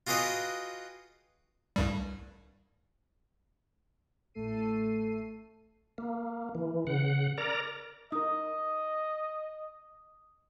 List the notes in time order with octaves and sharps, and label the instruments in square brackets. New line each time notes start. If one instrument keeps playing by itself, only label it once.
[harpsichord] F4 F#4 G#4 B4 D#5 G5
[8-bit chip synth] C2 G2 G3
[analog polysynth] A1 A2 A3 A4 C7 D#7
[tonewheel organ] A#3
E3
C#3 F#5
A#4 D5 A#5
[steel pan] D#4 A#4 [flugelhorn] D#5 [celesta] D#6